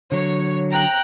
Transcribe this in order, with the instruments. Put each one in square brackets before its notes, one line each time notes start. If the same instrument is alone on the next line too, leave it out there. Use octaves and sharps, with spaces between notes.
[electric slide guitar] D3 F#3 [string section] C#5
[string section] G5 A#5 F#6